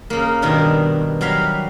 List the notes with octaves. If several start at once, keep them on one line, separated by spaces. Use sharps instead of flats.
C#3 A#3
G2 B2 D#3 D4 A#4
F#3 G3 F5 A#5 B5